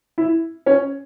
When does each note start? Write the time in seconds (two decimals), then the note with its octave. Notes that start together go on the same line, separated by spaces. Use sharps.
0.18 E4
0.66 C#4